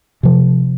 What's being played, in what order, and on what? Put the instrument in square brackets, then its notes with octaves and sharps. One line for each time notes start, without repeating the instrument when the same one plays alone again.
[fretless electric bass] C3 F3